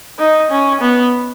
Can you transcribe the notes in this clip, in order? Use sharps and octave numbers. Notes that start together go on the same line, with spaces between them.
D#4
C#4
B3